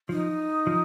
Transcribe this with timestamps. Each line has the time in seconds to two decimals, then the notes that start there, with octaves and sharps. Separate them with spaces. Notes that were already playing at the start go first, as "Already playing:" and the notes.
0.09 F3 D#4
0.67 F3